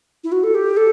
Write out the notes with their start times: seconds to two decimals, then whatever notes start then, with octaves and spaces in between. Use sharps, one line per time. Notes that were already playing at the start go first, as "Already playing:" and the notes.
0.24 E4
0.32 F#4
0.44 A4
0.55 G4
0.77 A4